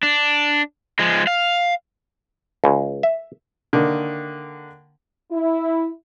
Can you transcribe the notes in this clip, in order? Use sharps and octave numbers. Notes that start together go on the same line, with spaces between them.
D4
F3 G#3
F5
C#2
E5
D3 D#3 A#3
E4